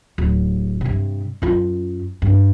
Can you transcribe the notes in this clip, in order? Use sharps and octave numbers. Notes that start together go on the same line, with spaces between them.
D1
G2 C3
F#2 F4
G2